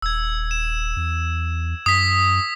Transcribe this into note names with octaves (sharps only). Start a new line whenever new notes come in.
D#1 E6 G#6
E7
E2
F#2 D#6 B6